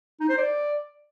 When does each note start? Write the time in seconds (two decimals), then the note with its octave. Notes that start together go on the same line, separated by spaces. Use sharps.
0.20 D#4
0.29 C5
0.38 D5